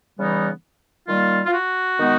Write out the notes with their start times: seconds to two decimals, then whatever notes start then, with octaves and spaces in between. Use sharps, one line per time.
0.18 C#3 E3 G3 B3 D#4
1.08 D#3 G3 A#3 F4
1.46 F4
1.54 F#4
1.99 D#3 G#3 B3 D#4